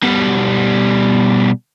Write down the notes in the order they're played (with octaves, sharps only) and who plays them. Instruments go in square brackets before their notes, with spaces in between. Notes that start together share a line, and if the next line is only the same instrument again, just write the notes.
[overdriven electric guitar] B2 G3